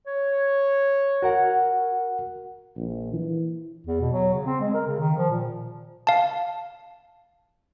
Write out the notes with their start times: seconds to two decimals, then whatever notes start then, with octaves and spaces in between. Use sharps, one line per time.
0.07 C#5
1.22 F#4 A#4 F#5
2.77 A#1
3.13 E3
3.86 E2
4.00 B2
4.12 F#3
4.33 C#3
4.46 C4
4.60 G#3
4.74 A#4
4.87 C#3
4.99 D#3
5.17 F3
5.30 A#2
6.07 F5 A5